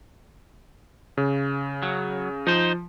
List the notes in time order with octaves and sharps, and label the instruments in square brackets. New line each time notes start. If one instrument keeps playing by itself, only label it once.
[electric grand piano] C#3
[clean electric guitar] F#3
[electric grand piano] F3 [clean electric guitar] D#4 C5